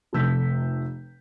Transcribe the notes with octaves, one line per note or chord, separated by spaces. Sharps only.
F1 C3 A3 E6 G6 B6